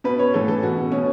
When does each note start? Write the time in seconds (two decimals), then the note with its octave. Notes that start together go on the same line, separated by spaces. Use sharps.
0.04 B2 B4
0.19 C#5
0.34 A2 E3 A4
0.48 A4
0.63 B2 F#4
0.92 B2 C#4